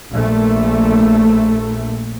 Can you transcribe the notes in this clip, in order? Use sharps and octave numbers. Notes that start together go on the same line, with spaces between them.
A#1 A3